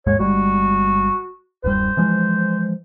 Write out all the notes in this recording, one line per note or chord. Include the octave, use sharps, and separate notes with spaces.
D#2 G#2 G#3 C#5
G1 G3 G#3 F#4
D1 F#2 G3 C5
E3 F3 G#3